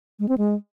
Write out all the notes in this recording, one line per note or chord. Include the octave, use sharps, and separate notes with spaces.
G#3
C4
G#3